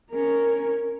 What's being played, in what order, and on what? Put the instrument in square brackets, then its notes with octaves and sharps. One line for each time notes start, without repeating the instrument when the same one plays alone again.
[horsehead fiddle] C#4 A#4